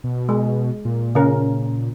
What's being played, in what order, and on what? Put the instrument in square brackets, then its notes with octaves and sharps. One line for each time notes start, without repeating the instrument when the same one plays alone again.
[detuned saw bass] B2
[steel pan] G#3
[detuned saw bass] A#2
[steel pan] C#3 A#4